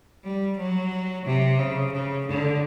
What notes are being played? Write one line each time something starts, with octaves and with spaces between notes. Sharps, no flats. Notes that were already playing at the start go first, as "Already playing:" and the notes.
G3
F#3
C3
C#3
C#3
D3